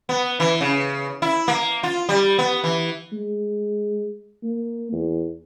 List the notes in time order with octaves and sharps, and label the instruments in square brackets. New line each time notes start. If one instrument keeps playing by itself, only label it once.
[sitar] B3
E3
C#3
E4
A#3
F4
G3
B3
E3
[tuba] G#3
A#3
E2